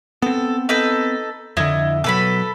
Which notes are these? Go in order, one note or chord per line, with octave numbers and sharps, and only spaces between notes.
B3 C4 A4
D#4 A4 B4
F2 D3 E4 D#5
B2 F#3 A4 B4 B5